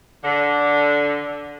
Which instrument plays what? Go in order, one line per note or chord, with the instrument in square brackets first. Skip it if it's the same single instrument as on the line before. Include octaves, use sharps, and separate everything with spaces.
[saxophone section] D3